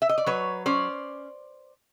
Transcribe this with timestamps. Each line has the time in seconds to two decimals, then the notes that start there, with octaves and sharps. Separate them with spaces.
0.02 E5
0.09 D#5
0.18 D5
0.26 F#3 B4 C#5
0.66 C#4 C5 D5